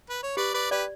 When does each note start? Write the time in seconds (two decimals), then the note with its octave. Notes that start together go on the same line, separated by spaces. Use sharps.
0.10 B4
0.23 C#5
0.37 G4 B4 D5
0.54 B4 D5
0.71 G4 B4 D5